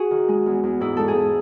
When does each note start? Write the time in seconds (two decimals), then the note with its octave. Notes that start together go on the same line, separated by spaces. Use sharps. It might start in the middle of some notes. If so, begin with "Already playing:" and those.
Already playing: F#4 G#4
0.11 D#3
0.28 G#3
0.46 E2
0.63 E2
0.81 G#2 E4
0.97 G#2 A4
1.08 G#4
1.16 G#2